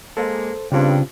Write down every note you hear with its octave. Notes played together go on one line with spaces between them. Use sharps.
G#3 A#3 A4 C5
G2 C#3 C4 F4 G4